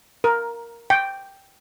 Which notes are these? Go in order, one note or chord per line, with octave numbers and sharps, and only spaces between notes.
A#4
G5